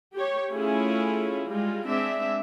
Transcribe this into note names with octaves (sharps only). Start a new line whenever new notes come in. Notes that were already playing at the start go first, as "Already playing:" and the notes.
G4 C#5
A3 C#4 E4 F4 G#4
G3 G#3 F4
G#3 C4 D4 E5